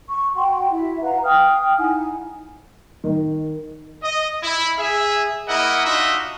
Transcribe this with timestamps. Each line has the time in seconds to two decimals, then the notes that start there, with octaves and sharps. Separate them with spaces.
0.08 C#6
0.36 F#4 F#5 G5 C6
0.70 E4 F#4 E5
1.02 B4 F5 F#5 A#5
1.24 F5 G5 D#6 F6
1.78 D#4 E4 F#5 G#5
3.04 D#3
4.02 D#5
4.43 E4
4.78 G#4 E5
5.48 A#3 E4 A#4 D#5 E5 F#5
5.85 D4 D#4 F4 F#4 D#5 E5